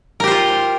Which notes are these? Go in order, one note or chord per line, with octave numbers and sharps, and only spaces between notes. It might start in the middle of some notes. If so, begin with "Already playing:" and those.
F4 G4 A#4 C5